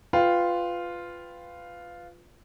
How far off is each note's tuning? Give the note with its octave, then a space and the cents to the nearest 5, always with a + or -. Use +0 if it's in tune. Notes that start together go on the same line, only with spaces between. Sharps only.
F4 +0 B4 +15 G5 +0